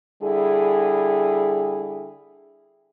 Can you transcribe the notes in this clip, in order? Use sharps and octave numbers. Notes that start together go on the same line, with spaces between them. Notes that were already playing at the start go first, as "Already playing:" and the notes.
D3 G3 E4 G#4